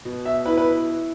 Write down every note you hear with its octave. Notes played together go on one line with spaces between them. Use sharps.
B2
E5
E4 B4
B4